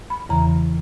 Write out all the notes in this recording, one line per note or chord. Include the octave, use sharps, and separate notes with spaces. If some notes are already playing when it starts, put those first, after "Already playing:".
B5
E2 C#3 E3 A#5